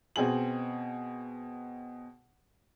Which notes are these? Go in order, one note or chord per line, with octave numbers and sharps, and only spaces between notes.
B2 C4 G#4 F#7